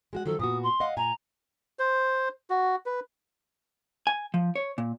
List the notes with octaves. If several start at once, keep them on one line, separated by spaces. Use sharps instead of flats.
G#3 F#4 F#5
D#3 F3 F#3 A4
A#2 B3 F#4 D#6
C6
D#5 F5 F#5
A#2 G#5 A#5
C5
F#4
B4
G#5
F3
C#5
A#2